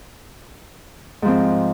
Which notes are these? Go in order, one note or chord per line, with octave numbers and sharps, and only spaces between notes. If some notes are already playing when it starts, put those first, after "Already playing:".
G#2 F3 C4